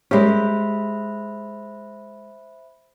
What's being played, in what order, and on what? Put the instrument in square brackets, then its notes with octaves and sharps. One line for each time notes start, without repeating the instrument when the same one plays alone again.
[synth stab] G3 A#3 C#4 [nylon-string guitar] G#3 G4 [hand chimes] C5 E5 B5